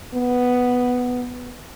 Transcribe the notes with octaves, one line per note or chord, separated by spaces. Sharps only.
B3